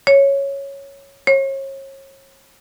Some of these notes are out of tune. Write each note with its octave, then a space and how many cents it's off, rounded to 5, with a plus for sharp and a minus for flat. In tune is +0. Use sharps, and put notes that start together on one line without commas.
C#5 -5
C#5 -35